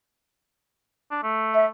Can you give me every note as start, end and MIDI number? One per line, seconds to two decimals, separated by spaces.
1.11 1.20 62
1.23 1.68 57
1.55 1.65 76